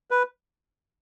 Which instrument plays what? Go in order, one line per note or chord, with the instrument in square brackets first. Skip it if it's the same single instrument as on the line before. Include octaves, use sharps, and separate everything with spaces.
[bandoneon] B4